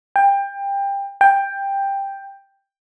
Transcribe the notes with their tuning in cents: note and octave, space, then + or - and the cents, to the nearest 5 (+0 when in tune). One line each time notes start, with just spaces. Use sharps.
G5 +20
G5 +10